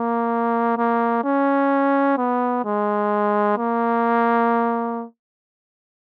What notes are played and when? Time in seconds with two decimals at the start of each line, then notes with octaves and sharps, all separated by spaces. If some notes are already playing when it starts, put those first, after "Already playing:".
Already playing: A#3
0.78 A#3
1.24 C#4
2.17 B3
2.64 G#3
3.57 A#3